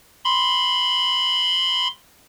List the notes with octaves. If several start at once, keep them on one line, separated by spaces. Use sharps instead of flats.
B5 C6